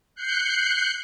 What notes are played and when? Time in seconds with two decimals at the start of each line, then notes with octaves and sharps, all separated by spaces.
0.15 F#6 G6 C7 C#7